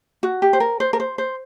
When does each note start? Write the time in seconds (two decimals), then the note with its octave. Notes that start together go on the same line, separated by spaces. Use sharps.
0.23 F#4
0.42 G4
0.53 C5
0.60 A#4
0.80 C5
0.93 A#4
1.00 C5
1.18 C5